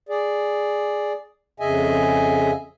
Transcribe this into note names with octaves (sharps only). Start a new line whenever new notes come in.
G#4 D5
F2 C#3 G#4 D#5 E5 G#5